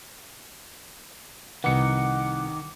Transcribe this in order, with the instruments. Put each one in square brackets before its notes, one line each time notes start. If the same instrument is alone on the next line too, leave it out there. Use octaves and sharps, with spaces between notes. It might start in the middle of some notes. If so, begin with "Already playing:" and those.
[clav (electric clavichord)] C2 D#4 B4 [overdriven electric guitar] D#3 [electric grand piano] F#5 C#7 [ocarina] D6